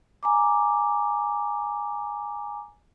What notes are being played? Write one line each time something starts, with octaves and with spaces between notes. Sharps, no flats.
G#5 A#5 D6